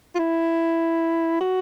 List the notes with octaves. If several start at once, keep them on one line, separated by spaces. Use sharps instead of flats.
F4
E4
F#4